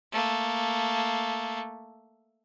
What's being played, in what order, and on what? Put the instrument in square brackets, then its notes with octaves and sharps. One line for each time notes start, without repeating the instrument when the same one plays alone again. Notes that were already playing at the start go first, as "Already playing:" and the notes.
[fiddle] A3 A#3